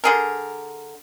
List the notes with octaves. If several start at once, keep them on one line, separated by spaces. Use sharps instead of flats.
D3 G#4 A#4